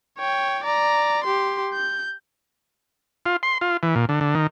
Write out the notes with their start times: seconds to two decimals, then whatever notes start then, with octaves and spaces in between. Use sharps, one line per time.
0.19 C#5 G5
0.64 D5 A#5
1.24 G4 C6
1.73 G6
3.26 F4
3.43 C6
3.61 F4
3.83 E3
3.96 A#2
4.09 D3
4.21 D3
4.35 D#3